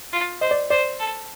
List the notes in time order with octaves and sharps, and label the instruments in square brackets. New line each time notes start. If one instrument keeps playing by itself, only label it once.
[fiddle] F4
[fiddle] C5 [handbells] D#5
[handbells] D5
[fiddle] C5 [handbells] D5
[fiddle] A4